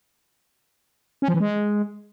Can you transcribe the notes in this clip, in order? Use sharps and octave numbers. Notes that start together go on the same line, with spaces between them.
C#4
F3
E3
G#3